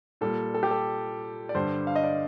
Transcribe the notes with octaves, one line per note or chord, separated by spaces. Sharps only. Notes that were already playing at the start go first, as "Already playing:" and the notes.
A#2 G3 A4
A4
G4
A4
D5
G2 D3 G3 C5
F5
D#5
D5